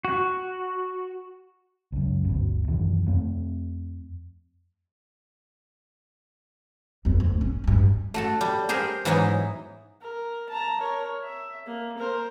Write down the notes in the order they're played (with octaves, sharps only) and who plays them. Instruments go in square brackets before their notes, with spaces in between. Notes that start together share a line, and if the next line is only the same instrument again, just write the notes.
[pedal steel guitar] F#4
[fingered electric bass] C#2 F#2
G1 D2 B2
F#2 B2 D#3 E3
F2 A3 C4
[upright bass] G1 F2
D2
C#4
G2 G#3
[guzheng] A3 F#4 A4
G3
G4 G#4 A#4 C5
G#2 E3 F#3 B3 D#4 E4
[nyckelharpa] A#4
A5 A#5
A#4 C#5
E5
A#3
A#4 C5